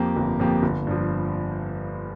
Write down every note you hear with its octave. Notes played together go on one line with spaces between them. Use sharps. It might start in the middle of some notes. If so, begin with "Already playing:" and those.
Already playing: F2 F3 A#3 G4
G1
F2 F3 A#3 G4
G1
G2 F3